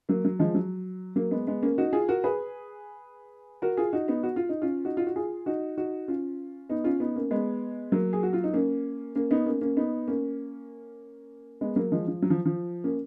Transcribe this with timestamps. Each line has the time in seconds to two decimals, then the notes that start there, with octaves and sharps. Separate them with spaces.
0.09 F#3 A#3
0.25 F#3
0.39 F3 G#3
0.55 F#3
1.16 F#3 A#3
1.31 G#3 B3
1.47 G#3 B3
1.63 A#3 C#4
1.78 D#4 F#4
1.93 F4 G#4
2.08 F#4 A#4
2.24 G#4 B4
3.62 F#4 A#4
3.77 F4 G#4
3.93 D#4 F#4
4.08 B3 D#4
4.23 F#4
4.36 F4
4.49 D#4
4.62 C#4 F4
4.85 D#4 F#4
4.97 F4
5.07 F#4
5.16 F4 G#4
5.46 D#4 F#4
5.78 D#4 F#4
6.08 C#4 F4
6.69 B3 D#4
6.84 C#4 F4
7.00 B3 D#4
7.16 A#3 C#4
7.31 G#3 B3
7.92 F#3 A#3
8.13 G#4
8.23 F#4
8.33 F4
8.44 D#4
8.54 A#3 C#4
9.15 A#3 C#4
9.31 B3 D#4
9.46 A#3 C#4
9.61 A#3 C#4
9.77 B3 D#4
10.08 A#3 C#4
11.61 G#3 B3
11.76 F#3 A#3
11.92 F3 G#3
12.07 F3
12.22 F#3
12.30 F3
12.45 F3
12.84 A#3 C#4